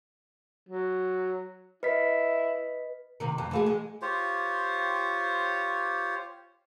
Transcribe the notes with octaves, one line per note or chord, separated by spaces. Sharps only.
F#3
E4 B4 D#5 B6
C3 D#3
F2
E3 A3 G#4
G#3
F4 G4 C5 C#5